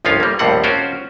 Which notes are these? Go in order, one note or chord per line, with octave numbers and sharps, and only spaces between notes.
G1 C2 F3 C#4 F4 F5
G3 A#3
A#1 D#2 A2 G3 C4 F#5
C#4 F4 F#4 A#4 C5